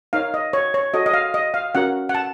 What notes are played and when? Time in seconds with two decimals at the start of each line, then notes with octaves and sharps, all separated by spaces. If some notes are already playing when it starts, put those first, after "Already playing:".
0.13 D#4 A#4 C#5 F5
0.34 D#5
0.53 C#5
0.74 C#5
0.94 F#4 A4 C#5 D#5
1.06 D#5
1.14 F5
1.34 D#5
1.54 F5
1.75 C#4 F#4 A#4 F#5
2.09 F#5
2.15 A5